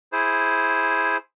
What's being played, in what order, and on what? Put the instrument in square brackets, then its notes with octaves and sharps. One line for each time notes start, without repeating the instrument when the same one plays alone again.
[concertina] E4 G#4 C5